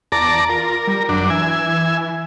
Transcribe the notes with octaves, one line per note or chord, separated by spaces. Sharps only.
E2 D5 A5 A#5
F4 A#4
G3
G#1 F#2 D4
E3 E5 G#5